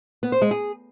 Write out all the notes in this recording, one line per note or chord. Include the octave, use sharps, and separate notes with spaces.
B3
C5
G#3
G#4